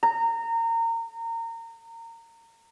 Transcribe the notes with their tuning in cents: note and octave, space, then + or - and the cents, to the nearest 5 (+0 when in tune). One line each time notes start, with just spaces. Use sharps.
A#5 -25